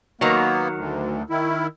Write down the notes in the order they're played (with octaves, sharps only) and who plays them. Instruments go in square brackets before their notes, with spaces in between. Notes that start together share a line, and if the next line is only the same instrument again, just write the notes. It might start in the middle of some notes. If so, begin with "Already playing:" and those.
[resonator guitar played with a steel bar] D#3 F#3 [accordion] A#3 B3
[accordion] D2
D#3 E4